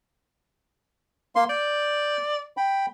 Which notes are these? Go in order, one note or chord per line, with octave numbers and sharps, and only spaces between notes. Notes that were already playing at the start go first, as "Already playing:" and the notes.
A#3 C6
D5 G6
G5 B5